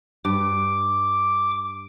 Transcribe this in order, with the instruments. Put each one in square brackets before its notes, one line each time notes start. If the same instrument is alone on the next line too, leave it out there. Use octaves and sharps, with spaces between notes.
[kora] G2 [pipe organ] D6